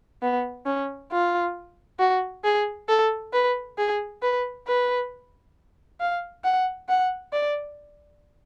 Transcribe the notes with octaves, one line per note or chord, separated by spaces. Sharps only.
B3
C#4
F4
F#4
G#4
A4
B4
G#4
B4
B4
F5
F#5
F#5
D5